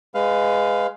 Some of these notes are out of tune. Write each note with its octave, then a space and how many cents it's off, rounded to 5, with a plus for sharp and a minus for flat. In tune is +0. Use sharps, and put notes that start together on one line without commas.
G#3 +0 B4 +20 F5 +0